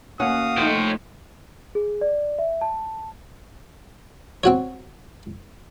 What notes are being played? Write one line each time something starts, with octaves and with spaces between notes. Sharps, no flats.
D#2 C#4 F#4 F5 F#5 D#6
F3 A3 D#4 C#5 G5
G#4
D5
E5
A5
C4 F#4 C#5